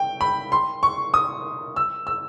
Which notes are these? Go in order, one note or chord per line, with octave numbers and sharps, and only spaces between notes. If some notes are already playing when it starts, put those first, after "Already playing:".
Already playing: G5
B5
C6
C#6
D#6
E6
E6